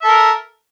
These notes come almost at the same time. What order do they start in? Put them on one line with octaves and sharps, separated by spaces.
E5 A4 A#4